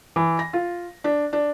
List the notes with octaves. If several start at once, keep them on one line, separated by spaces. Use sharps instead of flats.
E3
A#6
F4
D4
D4